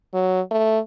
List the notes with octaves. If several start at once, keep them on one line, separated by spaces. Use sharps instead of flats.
F#3
A3